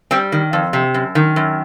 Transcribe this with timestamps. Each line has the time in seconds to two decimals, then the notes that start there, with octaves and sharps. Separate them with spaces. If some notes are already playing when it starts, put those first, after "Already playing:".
0.11 G3 C4
0.32 D#3
0.53 F2
0.73 C3
0.94 F#2
1.15 D#3
1.36 F#2